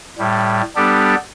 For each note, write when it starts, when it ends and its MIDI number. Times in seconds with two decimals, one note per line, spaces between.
0.18 0.62 45
0.18 0.62 55
0.76 1.15 55
0.76 1.15 59
0.76 1.15 62
0.76 1.15 67
0.76 1.15 69